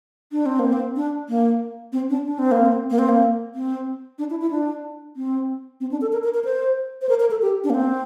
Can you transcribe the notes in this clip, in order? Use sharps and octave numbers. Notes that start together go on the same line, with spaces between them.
D4
C4
A#3
C4
D4
A#3
C4
D4
D4
C4
A#3
C4
A#3
C4
A#3
C4
D4
E4
E4
D4
C4
C4
D4
A4
A#4
A#4
A#4
C5
C5
A#4
A#4
A4
G4
D4
A#3
C4